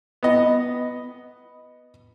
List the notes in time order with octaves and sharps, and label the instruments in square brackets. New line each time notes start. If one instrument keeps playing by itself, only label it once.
[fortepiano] B3 D#5